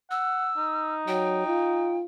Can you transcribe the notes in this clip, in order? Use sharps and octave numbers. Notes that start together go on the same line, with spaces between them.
F#5 E6
D#4
F#3 G5
F4